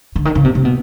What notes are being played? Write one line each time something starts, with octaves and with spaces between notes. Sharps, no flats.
D3
D#3
C#3
C3
C3
B2